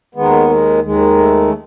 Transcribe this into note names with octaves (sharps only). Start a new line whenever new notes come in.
D#2 D#3 G#3 B3
G#3
D#2 D#3 G#3
A3
C#4